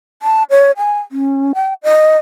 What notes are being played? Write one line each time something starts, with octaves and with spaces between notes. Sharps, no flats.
A5
C#5
G#5
C#4
G5
D#5